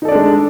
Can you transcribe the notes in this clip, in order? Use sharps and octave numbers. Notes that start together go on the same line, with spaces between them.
G#3 D4 D#4 A4 D5